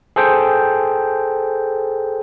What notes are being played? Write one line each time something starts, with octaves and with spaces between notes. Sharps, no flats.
G#4 A4 C5 G5